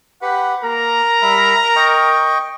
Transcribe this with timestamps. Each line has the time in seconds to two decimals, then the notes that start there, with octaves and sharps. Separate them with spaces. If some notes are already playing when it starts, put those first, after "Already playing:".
0.22 G4 B4 F#5
0.63 A#3 A#4 A#5
1.22 G3 E5 B5
1.76 D#5 G5 C#6